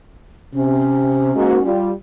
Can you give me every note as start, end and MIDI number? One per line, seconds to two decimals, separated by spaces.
0.54 1.32 48
0.54 1.68 61
1.35 1.58 44
1.35 1.58 58
1.35 1.58 66
1.64 1.91 55
1.64 1.91 65